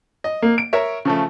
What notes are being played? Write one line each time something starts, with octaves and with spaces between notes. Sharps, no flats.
D#5
A#3
D7
A#4 C#5 E5
C#3 F3 A3